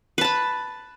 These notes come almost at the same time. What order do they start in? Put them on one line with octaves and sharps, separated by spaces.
B4 A5 B5